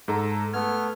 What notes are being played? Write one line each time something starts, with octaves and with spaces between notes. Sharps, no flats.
G#2 A4 A#5
A3 B3 F6 G#6